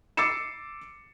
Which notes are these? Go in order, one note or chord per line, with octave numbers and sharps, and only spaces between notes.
D6 E6 A6 C7 C#7 E7